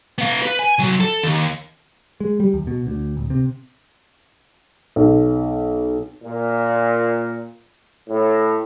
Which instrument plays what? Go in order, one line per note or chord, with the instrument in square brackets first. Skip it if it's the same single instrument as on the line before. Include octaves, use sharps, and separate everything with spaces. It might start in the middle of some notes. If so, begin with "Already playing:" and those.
[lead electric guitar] B3 F5
B4
G#5
C2 F#3
A4
D#2
[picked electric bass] G#3
G3
D#2
B2
D2
D1
C3
[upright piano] B1
[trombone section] A#2
A2